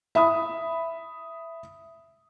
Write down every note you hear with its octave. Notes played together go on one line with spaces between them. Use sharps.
E5 B5 D#6